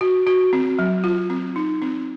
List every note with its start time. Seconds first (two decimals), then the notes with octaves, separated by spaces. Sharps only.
0.01 F#4
0.27 F#4
0.53 C4
0.79 F#3
1.04 F4
1.30 C4
1.56 D#4
1.82 C4